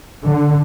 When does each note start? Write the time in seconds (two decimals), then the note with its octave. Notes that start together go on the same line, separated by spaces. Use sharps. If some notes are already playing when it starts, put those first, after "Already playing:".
0.23 D3